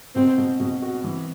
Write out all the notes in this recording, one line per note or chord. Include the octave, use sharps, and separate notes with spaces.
B2 C4
B2
B2
F#4
E3